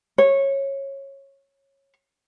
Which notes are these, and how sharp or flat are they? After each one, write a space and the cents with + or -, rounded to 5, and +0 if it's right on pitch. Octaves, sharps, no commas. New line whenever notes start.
C#5 -15